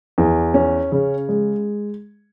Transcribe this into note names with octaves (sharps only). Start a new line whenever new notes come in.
E2
C#4
C#3
G#3